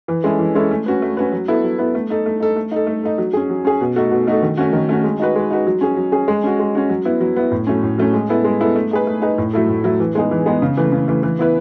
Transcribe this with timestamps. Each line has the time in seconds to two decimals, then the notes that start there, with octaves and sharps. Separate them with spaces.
0.08 E3
0.24 G#3 C#4 E4 A4
0.39 E3
0.55 G#3 C#4 E4 A4
0.71 A3
0.86 C#4 F#4 B4
1.02 A3
1.17 C#4 F#4 B4
1.32 F#3
1.48 B3 E4 A4
1.64 F#3
1.78 B3 E4 A4
1.95 A3
2.10 D#4 A4
2.26 A3
2.40 D#4 A4
2.56 A3
2.72 D#4 A4
2.87 A3
3.03 D#4 A4
3.18 F#3
3.33 C#4 G#4
3.50 F#3
3.65 C#4 G#4
3.81 B2
3.96 A3 D#4 F#4 A4
4.11 B2
4.27 A3 D#4 F#4 A4
4.42 D#3
4.57 A3 C#4 F#4
4.73 D#3
4.89 A3 C#4 F#4
5.04 G#3
5.19 D#4 F#4 B4
5.35 G#3
5.51 D#4 F#4 B4
5.67 F#3
5.81 C#4 G#4
5.97 F#3
6.12 C#4 G#4
6.28 G#3
6.43 C#4 F#4
6.60 G#3
6.75 C#4 F#4
6.89 F#3
7.05 B3 E4
7.21 F#3
7.36 B3 E4
7.51 A2
7.67 F#3 A3 C#4
7.82 A2
7.98 F#3 A3 C#4
8.13 G#3
8.29 B3 E4 A4
8.44 G#3
8.61 B3 E4 A4
8.76 A3
8.91 D#4 G#4 B4
9.07 A3
9.22 D#4 G#4 B4
9.38 A2
9.53 F#3 A3 E4 A4
9.69 A2
9.84 F#3 A3 E4 A4
10.00 E3
10.15 G#3 B3 D#4 G#4
10.31 E3
10.46 G#3 B3 D#4 G#4
10.62 C#3
10.77 E3 A3
10.92 C#3
11.08 E3 A3
11.23 E3
11.39 B3 E4 B4